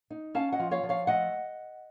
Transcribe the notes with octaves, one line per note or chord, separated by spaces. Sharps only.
D#4
C#4 F5 A5
D#5 F#5
F3
C#5 F5
F3
C#5 F5
A3 D#5 F#5